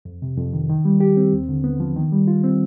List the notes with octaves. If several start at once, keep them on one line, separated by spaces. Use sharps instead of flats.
F2
C3
F2
D#3
D#3
G3
G4
C4
D#2
D3
B3
F3
D#3
G3
F4
C4